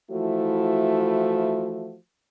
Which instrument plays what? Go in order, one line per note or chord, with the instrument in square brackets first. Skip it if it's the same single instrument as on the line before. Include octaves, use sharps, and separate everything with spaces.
[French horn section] E3 F3 A3 E4 F#4